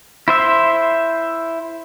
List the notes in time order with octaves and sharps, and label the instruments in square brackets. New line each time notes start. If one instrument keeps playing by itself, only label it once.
[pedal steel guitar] E4 C5 E5